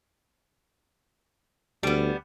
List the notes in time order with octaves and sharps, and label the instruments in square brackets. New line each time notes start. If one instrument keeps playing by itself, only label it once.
[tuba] D2 [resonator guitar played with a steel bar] G3 B3